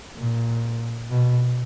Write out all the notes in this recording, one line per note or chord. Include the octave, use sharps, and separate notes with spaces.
A#2
B2